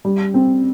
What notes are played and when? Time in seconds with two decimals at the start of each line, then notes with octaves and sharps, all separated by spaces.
0.05 G3
0.34 C4